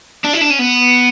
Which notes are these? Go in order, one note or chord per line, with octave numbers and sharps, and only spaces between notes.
D4
E4
D4
C#4
B3